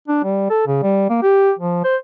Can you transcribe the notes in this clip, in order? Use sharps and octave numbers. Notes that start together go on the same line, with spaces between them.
D4
G3
A4
C#3
G3
A#3
G4
F3
C5